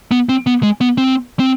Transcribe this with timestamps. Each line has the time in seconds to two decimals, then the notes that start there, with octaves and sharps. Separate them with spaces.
0.11 B3
0.29 C4
0.47 B3
0.63 G#3
0.81 B3
0.98 C4
1.40 C4